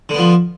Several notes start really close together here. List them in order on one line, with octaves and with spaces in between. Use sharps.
D3 B3 F3